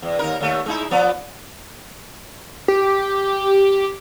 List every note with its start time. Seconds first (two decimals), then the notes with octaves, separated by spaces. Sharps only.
0.02 E2
0.19 D#2 D#4 A#4
0.40 D#2 A3
0.66 G#3 D#4 E4
0.91 F3 B3 D5
2.68 G4